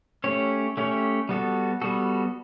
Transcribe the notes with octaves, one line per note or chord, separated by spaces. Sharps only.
A3 C#4 G4 C#5
A3 C#4 G4 C#5
G3 B3 F#4 A4
G3 B3 F#4 A4